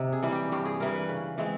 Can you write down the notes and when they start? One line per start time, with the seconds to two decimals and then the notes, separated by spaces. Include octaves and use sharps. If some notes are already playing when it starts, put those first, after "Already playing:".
Already playing: C3 D#4
0.13 G#4
0.23 E3 G3
0.32 G4
0.52 G2 G4
0.65 G#4
0.80 E3 G3 A#4
0.94 B4
1.09 C#3
1.38 E3 G#3 C4